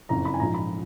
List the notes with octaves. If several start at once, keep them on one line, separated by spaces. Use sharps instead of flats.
F#1 F2 F3 A#5
B5
G#5
A#1 G#2 F3 A#5
B5